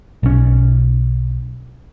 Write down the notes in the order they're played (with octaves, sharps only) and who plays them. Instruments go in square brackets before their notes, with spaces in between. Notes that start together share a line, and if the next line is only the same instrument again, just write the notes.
[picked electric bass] B1 C#4